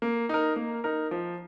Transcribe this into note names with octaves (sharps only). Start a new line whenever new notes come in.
A#3
D#4 A#4
A#3
D#4 A#4
F3